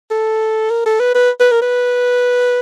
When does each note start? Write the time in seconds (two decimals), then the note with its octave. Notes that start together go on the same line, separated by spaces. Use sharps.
0.11 A4
0.70 A#4
0.86 A4
1.00 B4
1.15 B4
1.40 B4
1.51 A#4
1.62 B4